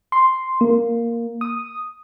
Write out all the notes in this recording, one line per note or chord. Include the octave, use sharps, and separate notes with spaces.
C6
A#3
D#6